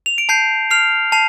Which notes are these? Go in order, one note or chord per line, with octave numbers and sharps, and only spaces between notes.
F7
D7
A5 G6 C7
F6 C7 F7
A5 C7 F7